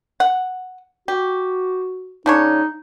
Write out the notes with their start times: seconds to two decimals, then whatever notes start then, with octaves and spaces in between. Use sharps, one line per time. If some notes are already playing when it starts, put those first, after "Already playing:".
0.20 F#5
1.08 F#4 G4
2.26 C#3 D4 D#4 C#5